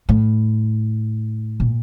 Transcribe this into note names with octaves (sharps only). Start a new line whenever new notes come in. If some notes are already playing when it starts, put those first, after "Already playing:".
A2
A#2